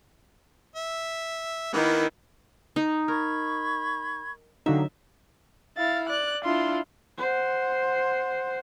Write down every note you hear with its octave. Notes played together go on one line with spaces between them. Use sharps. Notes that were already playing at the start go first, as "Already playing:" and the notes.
E5
D#3 A#3 B3 E4
D#4
A#4 B5 C#6 G#6
D3 F#3 D#4 G4 E5 F5
E4 F5 A6
D5 F#6
D4 E4 F4 C6
C5 F#5